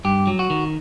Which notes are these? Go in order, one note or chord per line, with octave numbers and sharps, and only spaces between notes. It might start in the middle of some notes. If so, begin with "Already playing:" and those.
G2 G4
F#3
F#4
D#3